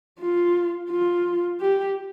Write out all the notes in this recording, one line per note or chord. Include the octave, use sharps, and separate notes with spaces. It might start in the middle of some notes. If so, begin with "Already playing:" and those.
F4
F4
G4